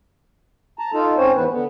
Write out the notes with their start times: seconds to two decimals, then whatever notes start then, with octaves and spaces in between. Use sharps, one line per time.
0.79 A5 A#5
0.94 D#4 F4 A4
1.17 G#2 C4 C#4 C5 C#5
1.36 E2 E3 B3 B4
1.50 D3 B3